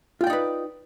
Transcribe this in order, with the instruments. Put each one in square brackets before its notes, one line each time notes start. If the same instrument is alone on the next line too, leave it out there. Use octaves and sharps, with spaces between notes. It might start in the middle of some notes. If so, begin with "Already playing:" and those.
[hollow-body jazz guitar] F4
G5
D5
D#4
B4